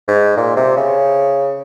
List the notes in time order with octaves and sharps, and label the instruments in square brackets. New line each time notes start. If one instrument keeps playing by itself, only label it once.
[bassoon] G#2
A#2
C3
C#3